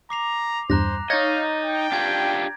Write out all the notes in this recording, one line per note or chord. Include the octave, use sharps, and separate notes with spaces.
A#5 D6 C7 F7
E2 G2 C5 A#5 F#6 A#6
D#4 C#5 D#5 F5 G6 A6 A#6
G5
D4 F4 G4 G#6 D7